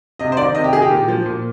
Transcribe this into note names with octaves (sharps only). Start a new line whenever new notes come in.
C3 D#5
C5
D#3 D5
C3 D#5
G4
D#3 G#4
G4
A#2
F3
A#2